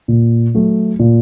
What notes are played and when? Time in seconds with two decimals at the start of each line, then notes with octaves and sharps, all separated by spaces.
0.08 A#2
0.54 F#3 A3
0.99 A#2